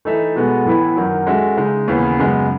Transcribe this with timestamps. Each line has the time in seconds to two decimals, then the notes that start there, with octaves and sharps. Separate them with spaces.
0.05 E3 A3 D#4 A4 E5
0.35 B2 G#3 B3 F#4 A4
0.65 A2 E3 B3 E4 B4
0.96 F#2 D#3 F#3
1.27 G#3 C#4 F#4 A4 E5
1.57 C#3 G#3 D#4
1.88 D#2 C#3 E3 B3
2.18 F#2 C#3 G#3 B3